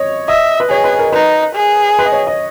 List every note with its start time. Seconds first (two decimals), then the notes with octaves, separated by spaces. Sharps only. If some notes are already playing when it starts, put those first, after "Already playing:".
Already playing: C#5 D#5
0.28 D#5 E5
0.60 B4
0.70 G#4 C#5
0.84 B4
0.99 A#4
1.12 D#4 B4
1.56 G#4
1.99 B4
2.05 D#5
2.12 C#5
2.27 D#5